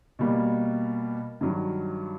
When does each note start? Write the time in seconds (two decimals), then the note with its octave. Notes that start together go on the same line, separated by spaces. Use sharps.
0.19 B2 G3 A#3
1.41 G2 D#3 F#3